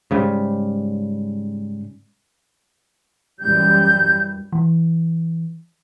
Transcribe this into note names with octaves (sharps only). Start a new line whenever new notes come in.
G#2 C#3 G3
F#2 E3 G3 G6
E3